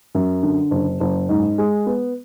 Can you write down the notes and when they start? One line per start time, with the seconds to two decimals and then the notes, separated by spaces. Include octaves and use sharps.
0.15 F#2
0.43 D3
0.71 F#1
1.00 F#1
1.29 G#2
1.58 G#3
1.86 B3